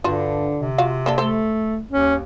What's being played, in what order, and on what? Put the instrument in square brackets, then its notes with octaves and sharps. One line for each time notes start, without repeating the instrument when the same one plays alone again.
[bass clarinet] G2 [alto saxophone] D3 [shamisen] F4 F#4
[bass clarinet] C3
[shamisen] F4 F#4 F5
A#3 D4 A4
[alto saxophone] A3 [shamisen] A4 C5
[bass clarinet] D#2 [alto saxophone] C#4